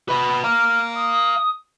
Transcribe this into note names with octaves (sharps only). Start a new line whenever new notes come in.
B4 D#5 B5
F5 A#5 F6
D#6